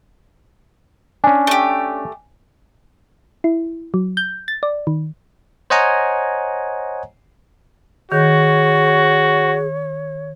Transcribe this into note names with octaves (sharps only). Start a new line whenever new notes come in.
C#4 D4 G#5
A3 G4
E4
F#3
G6
A6
D5
D#3
C5 C#5 D#5 F#5 G#5 A#5
D#3 F#4 G#4 C#5